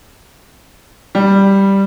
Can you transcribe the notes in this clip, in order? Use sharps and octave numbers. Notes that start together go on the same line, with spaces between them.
G3